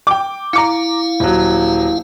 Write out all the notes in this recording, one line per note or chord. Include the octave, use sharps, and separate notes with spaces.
G5 D6
E4 F5 A#5 D6 C#7
D#1 F#3